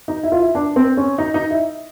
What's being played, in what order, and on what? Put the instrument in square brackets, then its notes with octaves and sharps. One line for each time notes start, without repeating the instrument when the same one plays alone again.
[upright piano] D#4
E4
F4
E4
D4
C4
C#4
D#4
D#4
E4